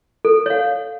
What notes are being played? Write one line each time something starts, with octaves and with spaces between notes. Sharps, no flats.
A4
C#5 F5